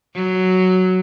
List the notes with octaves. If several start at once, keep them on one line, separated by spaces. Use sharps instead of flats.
F#3